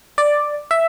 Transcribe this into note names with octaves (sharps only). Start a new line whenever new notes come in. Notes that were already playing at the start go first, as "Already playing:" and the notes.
D5
E5